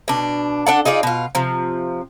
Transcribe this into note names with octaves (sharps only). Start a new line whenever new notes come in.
B2 D4
D4 A4 F#5
D#4 F4 G#4 D5
B2 F4
C3 F3